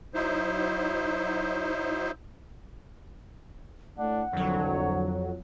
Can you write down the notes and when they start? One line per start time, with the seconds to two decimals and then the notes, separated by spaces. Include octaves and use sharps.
0.14 F#3 D#4 E4 C5
3.98 A2 D4 F#5
4.33 C2 F2 D3 F#3 C#5